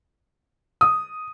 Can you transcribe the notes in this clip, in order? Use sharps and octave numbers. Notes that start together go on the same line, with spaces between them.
D#6